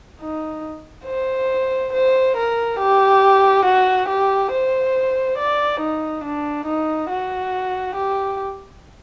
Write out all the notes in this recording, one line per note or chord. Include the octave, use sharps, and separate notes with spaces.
D#4
C5
C5
A#4
G4
F#4
G4
C5
D5
D#4
D4
D#4
F#4
G4